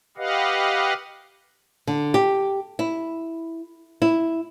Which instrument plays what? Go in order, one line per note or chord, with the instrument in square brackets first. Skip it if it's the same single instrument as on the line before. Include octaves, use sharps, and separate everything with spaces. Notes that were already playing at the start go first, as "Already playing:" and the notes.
[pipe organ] G4 B4 D#5 F5 F#5
[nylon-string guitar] D3
G4
E4
E4